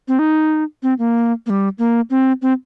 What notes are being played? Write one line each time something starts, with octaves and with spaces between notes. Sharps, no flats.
C4
D#4
C4
A#3
A#3
G3
A#3
C4
C4